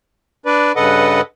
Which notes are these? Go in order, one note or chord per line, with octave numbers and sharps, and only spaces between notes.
D4 B4 D5
G2 C#3 A4 B4 D#5 F#5